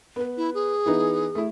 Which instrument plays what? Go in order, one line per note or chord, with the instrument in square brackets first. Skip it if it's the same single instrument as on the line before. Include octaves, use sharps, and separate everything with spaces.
[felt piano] B3 B4
[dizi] E4
G#4
[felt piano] E3 B3 D#4
A3 E4